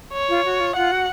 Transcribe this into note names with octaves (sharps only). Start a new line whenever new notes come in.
C#5
F4
F#4
F4
F4 F#5
F#4